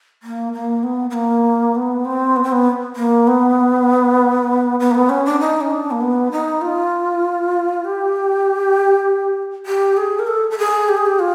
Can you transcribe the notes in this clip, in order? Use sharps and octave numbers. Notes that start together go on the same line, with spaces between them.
A#3
A#3
B3
B3
A#3
B3
C4
B3
C4
B3
A#3
B3
B3
A#3
B3
C#4
D4
D#4
C#4
D4
A#3
B3
D#4
F4
G4
G4
G#4
A#4
A4
A4
G#4
G4
G#4
G4
F4